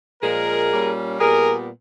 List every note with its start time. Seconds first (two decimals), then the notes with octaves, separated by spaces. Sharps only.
0.22 A#2 F3 G#3 G#4 A#4
0.71 A#2 G3 A#3 C#4
1.20 A#2 G3 B3 G#4 A#4